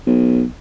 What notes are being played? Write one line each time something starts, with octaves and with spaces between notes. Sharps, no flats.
B1